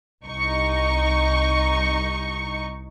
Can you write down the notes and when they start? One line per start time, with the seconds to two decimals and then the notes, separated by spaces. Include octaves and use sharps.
0.24 C2 D#4 C#6